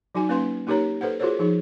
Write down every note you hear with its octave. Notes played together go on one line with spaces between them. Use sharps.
F#3 D#4 F#4 G#5
A#3 C#4 B4 F5 C6
A#3 D#4 G4 A#4 C#5 A#5
A4 B4 C5 F#5
F4 F#4 G#4 A#4 C5 C#5
F3 D#4 G#4